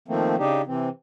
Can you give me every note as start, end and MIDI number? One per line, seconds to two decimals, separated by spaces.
0.08 0.36 51
0.08 0.36 53
0.08 0.36 57
0.08 0.36 58
0.08 0.36 60
0.38 0.62 49
0.38 0.62 62
0.38 0.62 63
0.38 0.62 67
0.67 0.89 48
0.67 0.89 52
0.67 0.89 60